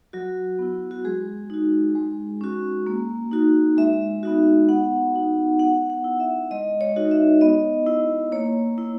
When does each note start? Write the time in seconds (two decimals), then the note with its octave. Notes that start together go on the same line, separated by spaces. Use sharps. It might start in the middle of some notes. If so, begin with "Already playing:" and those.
0.13 F#3 F#4
0.59 B3 E4
0.91 F#4
1.05 G#3 G#4
1.50 D#4 F#4
1.95 G#3
2.41 C#4 F#4
2.87 A#3
3.31 D#4 F#4
3.77 G#3 E5
4.23 B3 D#4 F#4
4.69 B3 F#5
5.14 D#4 F#4
5.59 B3 F#5
5.90 F#5
6.04 E4
6.20 E5
6.51 G#3 D#5
6.81 C#5
6.96 D#4 F#4
7.11 E5
7.41 B3 D#5
7.87 E4
8.32 A#3 C#5
8.78 E4